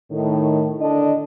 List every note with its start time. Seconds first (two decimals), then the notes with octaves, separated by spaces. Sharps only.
0.11 A2 D#3
0.80 D3 D4 D#5